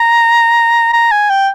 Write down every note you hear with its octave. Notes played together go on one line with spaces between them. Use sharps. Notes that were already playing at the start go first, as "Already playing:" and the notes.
Already playing: A#5
A#5
G#5
G5